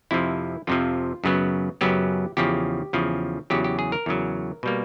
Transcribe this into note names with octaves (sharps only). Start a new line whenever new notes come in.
F2 C3 F3 E4
F2 C3 F3 F4
F#2 C#3 F#3 B3
F#2 C#3 F#3 B3 G4
E2 C#3 F3 G4
E2 C#3 F3
E2 C#3 F#3 G4
G4
G#4
A#4
E2 C#3 F#3
B2 G3 A#3